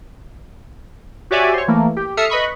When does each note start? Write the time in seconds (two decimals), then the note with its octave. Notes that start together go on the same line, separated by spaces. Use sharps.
1.31 F#4 G4 C#5 D5 E5 G#5
1.53 C5 C#5
1.68 E3 A3 A#3
1.96 G4
2.17 A4 E5 D#6 F6 C7 C#7
2.30 B4 D#5 B5 C#6